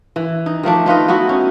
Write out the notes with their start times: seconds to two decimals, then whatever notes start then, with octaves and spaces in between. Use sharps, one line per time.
0.16 E3
0.46 D#4
0.63 D#3 F3 A3 D4
0.86 D#4 F4 B4 D#5
1.08 B3 D#4 E4 F#4
1.29 C#4